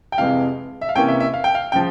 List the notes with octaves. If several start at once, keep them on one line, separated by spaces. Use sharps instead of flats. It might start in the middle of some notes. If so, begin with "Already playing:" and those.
G5
F2 C3 E3 G#3 F5
E5
F5
C3 E3 A#3 C#4 E4 G5
E5
E5
F5
G5
F5
C#3 F3 G5